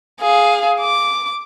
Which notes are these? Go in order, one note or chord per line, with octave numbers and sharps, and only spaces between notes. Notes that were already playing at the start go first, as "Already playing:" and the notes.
G#4 F5
D6